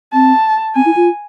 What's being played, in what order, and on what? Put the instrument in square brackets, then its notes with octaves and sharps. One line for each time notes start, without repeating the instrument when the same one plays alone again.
[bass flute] C4 [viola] A5
[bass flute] C4 [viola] G#5
[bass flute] E4
F4